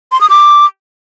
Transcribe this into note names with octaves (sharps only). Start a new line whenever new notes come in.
C6
D#6
D6